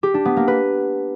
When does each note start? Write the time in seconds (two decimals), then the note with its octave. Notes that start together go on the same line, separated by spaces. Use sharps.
0.03 G4
0.14 D4
0.25 B3
0.37 A#3
0.48 B4